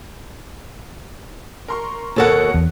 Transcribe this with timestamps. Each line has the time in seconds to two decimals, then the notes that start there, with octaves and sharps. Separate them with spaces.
1.68 A#4 C6 C#6
2.16 D#2 B2 A4 A#4 C#5 F#5
2.54 E2